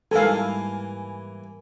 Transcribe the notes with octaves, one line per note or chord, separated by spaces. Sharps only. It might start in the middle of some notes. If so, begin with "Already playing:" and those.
G#2 E3 G3 A#3 A4 F5 G#5